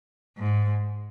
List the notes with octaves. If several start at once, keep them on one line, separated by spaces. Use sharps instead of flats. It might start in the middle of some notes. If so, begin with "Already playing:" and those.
G#2